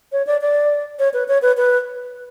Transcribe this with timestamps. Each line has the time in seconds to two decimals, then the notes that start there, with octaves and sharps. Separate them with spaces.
0.12 C#5
0.27 D5
0.41 D5
0.99 C#5
1.13 B4
1.28 C#5
1.42 B4
1.57 B4